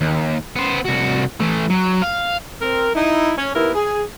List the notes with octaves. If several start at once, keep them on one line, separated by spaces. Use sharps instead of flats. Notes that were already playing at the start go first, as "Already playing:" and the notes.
D#2
B3 C5
C2 F#4
E3 A3
F#3
F5
C4 A#4
D#4 E4
C#4
D#2 B3 E4 A#4
G#4